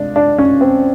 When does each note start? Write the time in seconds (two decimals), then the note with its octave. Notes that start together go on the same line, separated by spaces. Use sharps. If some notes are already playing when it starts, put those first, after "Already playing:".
Already playing: C3 G#3 D4
0.16 D4
0.39 C#4
0.61 C4